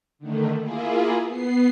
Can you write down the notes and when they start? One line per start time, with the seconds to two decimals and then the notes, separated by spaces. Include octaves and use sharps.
0.19 D3 D#3 A3
0.59 A#3 E4 F4 G#4
1.24 B3 C7